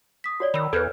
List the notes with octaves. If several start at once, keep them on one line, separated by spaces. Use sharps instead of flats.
D#6 B6
F#4 C#5 D5
D#3 B5 E6
E2 A4 B4 F6 G6 G#6